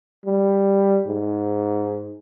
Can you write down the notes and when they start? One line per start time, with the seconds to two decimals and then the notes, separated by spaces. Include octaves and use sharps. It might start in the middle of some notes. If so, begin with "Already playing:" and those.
0.25 G3
1.07 G#2